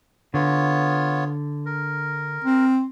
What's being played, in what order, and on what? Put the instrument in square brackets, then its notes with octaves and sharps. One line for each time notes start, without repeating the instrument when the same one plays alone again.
[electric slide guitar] D3 [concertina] B3 F4 C#5
[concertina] A#4
[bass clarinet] C4